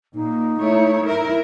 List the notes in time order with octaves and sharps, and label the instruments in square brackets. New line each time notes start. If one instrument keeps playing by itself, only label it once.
[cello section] A#2 [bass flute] D#4
[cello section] A3 E4 C#5
E4 A#4